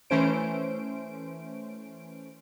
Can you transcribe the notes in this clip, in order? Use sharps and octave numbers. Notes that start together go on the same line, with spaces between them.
E3 A3 C#4 C5 D7